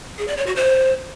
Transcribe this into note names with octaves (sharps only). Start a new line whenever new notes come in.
G#4
D5
C#5
F#4
C5